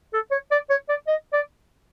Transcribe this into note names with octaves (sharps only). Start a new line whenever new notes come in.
A4
C#5
D5
C#5
D5
D#5
D5